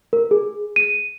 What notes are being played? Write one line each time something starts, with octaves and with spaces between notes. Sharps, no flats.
A#4
G#4
D#7